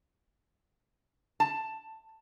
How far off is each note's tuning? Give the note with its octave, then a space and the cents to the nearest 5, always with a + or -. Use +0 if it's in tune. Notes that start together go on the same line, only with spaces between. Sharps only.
A5 +10